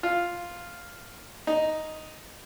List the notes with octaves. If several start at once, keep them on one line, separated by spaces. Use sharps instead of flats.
F4
D#4